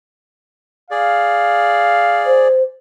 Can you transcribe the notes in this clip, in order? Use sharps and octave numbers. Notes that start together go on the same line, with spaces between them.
G#4 D5 F5
C5